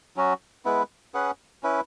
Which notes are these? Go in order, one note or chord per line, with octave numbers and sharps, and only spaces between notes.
F#3 C#4 F#4
G#3 B3 E4 B4
C#4 G#4 B4 F#5
C#4 E4 B4